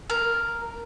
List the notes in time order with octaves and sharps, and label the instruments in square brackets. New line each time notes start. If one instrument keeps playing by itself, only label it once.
[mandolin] A#4